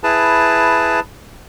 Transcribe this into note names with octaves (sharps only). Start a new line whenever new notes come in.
E4 G#4 B4 A5